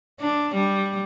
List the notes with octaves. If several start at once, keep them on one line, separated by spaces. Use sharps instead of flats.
D4
G3